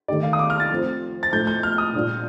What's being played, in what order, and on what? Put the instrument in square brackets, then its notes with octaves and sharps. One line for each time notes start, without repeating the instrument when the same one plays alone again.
[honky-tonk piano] D#3 A3 D4 G4 [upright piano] D5
[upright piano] F5
D#6
D6
F6
A6
[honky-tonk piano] F3 A3 C4 F4
[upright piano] A6
[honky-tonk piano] A2 F3 A3 [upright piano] G6
[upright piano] G6
F6
D#6
[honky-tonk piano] A#2 G3 D4 F4